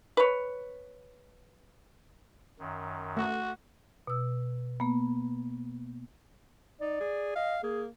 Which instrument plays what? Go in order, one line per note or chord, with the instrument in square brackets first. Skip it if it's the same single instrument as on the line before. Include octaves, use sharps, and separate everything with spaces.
[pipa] B4 C#5
[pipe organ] F#2 D#3
[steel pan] A3 [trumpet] F#4
[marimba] B2 E6
A#3 B3
[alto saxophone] D#4 [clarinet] D5
[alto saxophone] G#4
[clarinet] D#5 [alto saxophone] F5
[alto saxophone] A#3 [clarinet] G#4